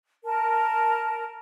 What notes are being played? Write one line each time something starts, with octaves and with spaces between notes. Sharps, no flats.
A#4 A5